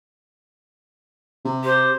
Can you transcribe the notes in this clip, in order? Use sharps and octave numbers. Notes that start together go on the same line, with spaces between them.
C3
G4 C5